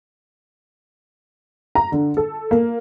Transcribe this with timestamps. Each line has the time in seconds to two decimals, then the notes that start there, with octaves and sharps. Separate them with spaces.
1.75 A#5
1.92 D3
2.17 A4
2.51 A#3